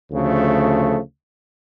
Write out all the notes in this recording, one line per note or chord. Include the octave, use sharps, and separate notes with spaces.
D2 C#3 F3 A3